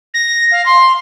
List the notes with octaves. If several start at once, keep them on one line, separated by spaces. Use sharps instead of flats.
A#6
F5
C6